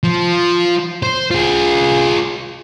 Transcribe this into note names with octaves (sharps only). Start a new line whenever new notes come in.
F3
C5
F4 G#4